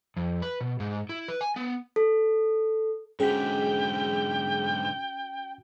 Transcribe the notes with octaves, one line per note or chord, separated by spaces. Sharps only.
F2
B4
B2
G#2
E4
B4
G#5
B3
A4
G#2 D3 C#4 F#4 G#4 G5 B6